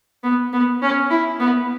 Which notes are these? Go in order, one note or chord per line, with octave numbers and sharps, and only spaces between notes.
B3
B3
C#4
E4
B3